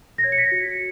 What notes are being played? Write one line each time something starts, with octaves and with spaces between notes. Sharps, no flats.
A#6
C#5 G#6
C#7
B6
F#4